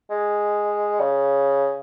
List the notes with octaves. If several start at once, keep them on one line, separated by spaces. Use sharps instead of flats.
G#3
C#3